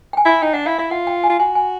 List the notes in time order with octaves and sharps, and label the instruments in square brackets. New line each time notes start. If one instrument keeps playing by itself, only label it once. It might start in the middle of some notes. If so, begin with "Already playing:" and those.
[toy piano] G5
G#5
[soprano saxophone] E4
[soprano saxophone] D#4 [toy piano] G5
[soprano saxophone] D4 [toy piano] F#5
[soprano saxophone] E4 [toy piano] F5
[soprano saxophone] E4 [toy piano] E5
[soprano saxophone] F4 [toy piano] F#5
[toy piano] G5
G#5
[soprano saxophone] F4
[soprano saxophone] F#4 [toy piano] G#5
[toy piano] G#5